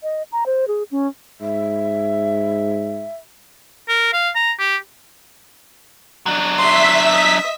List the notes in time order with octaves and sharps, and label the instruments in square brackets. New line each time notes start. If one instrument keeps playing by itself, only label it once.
[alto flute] D#5
A#5
C5
G#4
C#4
[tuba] G#2 [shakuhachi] E5
[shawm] A#4
F5
A#5
G4
[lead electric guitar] F#3 D4
[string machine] E5 B6 [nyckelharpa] C6
[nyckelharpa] D#5